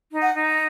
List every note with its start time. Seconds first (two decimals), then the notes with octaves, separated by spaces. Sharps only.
0.12 D#4
0.23 F#5
0.34 D#4